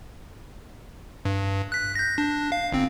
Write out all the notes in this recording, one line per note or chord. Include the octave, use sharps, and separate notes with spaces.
G2
F#6 B6
G6 A#6
D4
F5
G1 C4